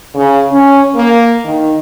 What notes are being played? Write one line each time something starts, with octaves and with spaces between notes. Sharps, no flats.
C#3
C#4
A#3
D#3